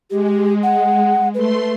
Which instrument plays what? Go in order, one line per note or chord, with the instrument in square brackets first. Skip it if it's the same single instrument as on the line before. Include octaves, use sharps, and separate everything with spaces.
[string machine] G#3 [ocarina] G4
[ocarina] F#5
[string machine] A3 C6 [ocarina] B4